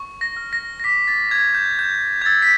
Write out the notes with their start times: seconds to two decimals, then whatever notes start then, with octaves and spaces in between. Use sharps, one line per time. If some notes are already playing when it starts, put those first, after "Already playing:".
Already playing: C#6
0.21 A#6
0.37 F6
0.53 A#6
0.80 A#6
0.84 D6 B6
1.08 A6
1.31 G6 G#6
1.55 G6
1.79 G6
2.22 G#6
2.25 E6 A6
2.42 B6